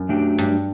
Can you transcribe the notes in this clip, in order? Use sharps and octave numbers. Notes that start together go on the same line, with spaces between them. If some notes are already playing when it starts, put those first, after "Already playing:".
Already playing: F#2
F#3 A3 D4 G4
G2